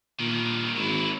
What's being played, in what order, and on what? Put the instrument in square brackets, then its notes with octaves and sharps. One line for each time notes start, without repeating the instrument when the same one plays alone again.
[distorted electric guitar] G2 D#3 [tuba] A#2
[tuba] G#1 [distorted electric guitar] F#3 E4